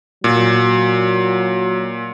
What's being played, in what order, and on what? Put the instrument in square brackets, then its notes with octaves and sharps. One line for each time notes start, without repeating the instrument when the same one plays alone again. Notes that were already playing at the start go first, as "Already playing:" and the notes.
[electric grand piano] A#2 [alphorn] F#3